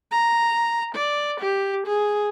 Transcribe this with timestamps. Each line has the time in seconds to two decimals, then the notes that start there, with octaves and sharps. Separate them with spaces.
0.11 A#5
0.95 D5
1.40 G4
1.86 G#4